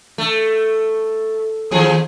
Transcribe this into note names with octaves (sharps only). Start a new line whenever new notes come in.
A3
D#2 F3 G#4